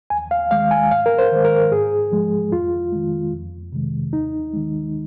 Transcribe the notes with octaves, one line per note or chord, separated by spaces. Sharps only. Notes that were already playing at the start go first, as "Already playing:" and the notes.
D#2 G#5
F5
D#3 G#3 F5
G#5
G#2 F5
A#4
C5
D#3 G#3
A#4
G#2 G#4
F3 G#3
F2 F4
D#3 G#3
F2
C3 D#3 G#3
D#2 D#4
D#3 G#3